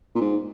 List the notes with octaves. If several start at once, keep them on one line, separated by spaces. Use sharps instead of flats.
A#2
G#2